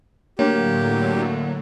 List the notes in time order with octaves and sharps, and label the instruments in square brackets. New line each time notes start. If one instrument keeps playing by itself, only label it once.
[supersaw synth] A2 D3 F#3 [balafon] A3 D4 C#5 [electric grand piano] A#3 [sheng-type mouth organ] G4